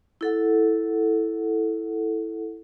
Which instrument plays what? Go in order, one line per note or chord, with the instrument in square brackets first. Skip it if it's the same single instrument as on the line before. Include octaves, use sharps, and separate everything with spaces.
[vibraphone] E4 A4 F#5